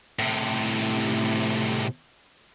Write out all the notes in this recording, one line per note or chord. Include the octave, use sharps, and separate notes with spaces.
A2 C3